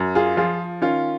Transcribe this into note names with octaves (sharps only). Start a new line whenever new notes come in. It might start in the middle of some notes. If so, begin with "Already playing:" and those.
Already playing: F#2
F4 G#4
F3 F4 G#4
D#3 C#4 F4